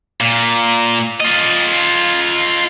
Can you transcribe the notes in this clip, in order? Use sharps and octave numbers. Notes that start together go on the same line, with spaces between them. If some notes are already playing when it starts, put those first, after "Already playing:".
A#2
F4 D#5